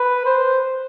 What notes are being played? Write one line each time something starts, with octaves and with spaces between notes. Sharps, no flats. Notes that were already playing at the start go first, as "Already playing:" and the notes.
Already playing: B4
C5